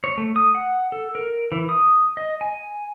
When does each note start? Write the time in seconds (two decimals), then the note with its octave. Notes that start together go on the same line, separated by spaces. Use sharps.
0.04 C#5
0.18 A3
0.36 D#6
0.55 F#5
0.92 A4
1.15 A#4
1.52 E3
1.69 D#6
2.17 D#5
2.41 G#5